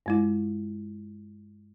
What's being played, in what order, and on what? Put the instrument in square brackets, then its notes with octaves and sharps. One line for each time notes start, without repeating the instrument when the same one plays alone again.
[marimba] G2 G#3 E4